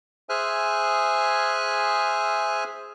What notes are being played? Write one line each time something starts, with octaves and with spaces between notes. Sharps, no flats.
G#4 C5 E5 G#5 F6 F#6